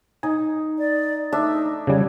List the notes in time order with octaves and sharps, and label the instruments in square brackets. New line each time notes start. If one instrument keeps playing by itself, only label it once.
[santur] D#4 [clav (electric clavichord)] G#5
[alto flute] D5
[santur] A3 D4 E5 [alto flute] D#4
[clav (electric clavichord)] C#3 G3 [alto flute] C#5